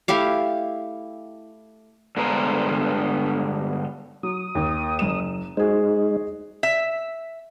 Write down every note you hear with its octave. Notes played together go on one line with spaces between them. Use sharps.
A3 E4 G4 F5
G2 D3 G#3 B3 C5 A#5
F#3 D#6
D#2
F#1 E7
G#3 D#4 F#4 G#4 C5
E5